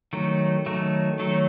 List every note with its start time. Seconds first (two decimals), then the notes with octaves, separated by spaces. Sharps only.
0.13 D#3 F#3 A3
0.66 D#3 F#3 A3
1.19 D#3 F#3 A3